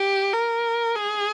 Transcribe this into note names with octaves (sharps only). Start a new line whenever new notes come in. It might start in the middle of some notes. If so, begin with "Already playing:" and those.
Already playing: G4
A#4
G#4